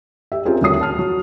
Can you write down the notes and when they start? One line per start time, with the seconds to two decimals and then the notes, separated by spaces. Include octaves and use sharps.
0.32 G4 E5
0.45 C4 C#4 F4 G4 G#4 A#4
0.61 D#1 D2 D3 C#5 D#6 C7
0.81 A5 F6
0.99 F#3